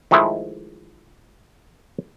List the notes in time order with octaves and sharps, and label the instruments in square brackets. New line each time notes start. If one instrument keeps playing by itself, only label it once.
[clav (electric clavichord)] D#3 F3 G#3 A3 E4